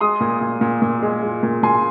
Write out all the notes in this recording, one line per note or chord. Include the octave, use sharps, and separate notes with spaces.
G#3 C6 D#6
A#2
A#2
A#2
A#2
G#3
G#3
A#2
A#2 G#5 C6